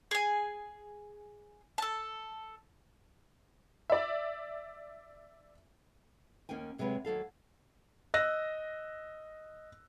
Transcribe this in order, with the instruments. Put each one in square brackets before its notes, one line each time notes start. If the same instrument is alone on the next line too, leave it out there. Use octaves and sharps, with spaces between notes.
[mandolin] G#4 G#5
A4 A5
[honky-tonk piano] D5 E5
[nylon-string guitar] D#2 A#3 C#4 G5 G#5
D2 C3 F#3 G#3 B4 C#5
D#2 F#3 A4 F5
[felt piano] D#5 E6 F#6 A#6